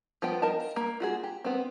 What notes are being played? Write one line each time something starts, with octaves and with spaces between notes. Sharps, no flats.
F3 B3 G5
A#4 D#5 F5 A5
A#3
F4 F#4 G#4
G4
B3 C4